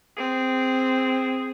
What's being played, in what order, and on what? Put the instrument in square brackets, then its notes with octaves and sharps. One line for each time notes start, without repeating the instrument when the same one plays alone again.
[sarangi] C4 [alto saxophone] G#4